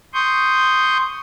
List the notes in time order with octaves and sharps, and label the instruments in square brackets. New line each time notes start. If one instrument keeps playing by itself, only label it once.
[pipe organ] C6 C#6 D#6 G6